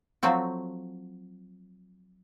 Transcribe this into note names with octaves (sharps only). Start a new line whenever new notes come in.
F3 F#3 A3 C4 F#4